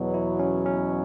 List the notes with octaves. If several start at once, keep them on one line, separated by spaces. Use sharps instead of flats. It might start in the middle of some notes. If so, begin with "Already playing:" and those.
Already playing: E2 B2 F#3
E4
C#4
C#4